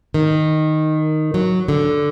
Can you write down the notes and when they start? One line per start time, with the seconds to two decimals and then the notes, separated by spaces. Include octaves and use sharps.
0.14 D#3
1.34 F#3
1.68 D3